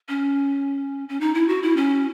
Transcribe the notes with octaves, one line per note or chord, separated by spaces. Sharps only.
C#4
C#4
D#4
E4
F#4
E4
C#4